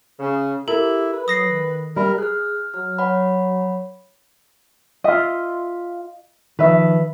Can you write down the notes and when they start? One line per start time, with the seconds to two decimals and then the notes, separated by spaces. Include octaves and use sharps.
0.20 C#3
0.68 E4 G4 A4 A#4
1.13 B4
1.28 F#3 D#6 A#6 C7
1.50 D#3
1.96 G3 A#4 E5 B5
2.18 G#4 F6 F#6
2.74 F#3 F6
2.98 C#5 F#5 B5
5.04 F4 D#5 E5
6.59 D#3 F3 B4 E5